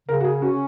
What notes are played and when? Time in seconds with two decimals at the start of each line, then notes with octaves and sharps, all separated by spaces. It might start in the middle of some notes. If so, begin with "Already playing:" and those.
0.08 C#3 A#4
0.21 F#4
0.24 G#4
0.41 C#4 F#4